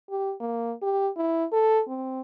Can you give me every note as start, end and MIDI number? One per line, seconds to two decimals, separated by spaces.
0.10 0.34 67
0.40 0.73 58
0.82 1.09 67
1.17 1.45 64
1.53 1.82 69
1.88 2.21 60